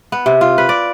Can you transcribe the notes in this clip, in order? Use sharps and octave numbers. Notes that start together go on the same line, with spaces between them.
B3
C3
F4
B4
D5